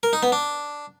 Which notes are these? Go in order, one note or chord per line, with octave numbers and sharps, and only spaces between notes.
A#4
D#4
B3
D4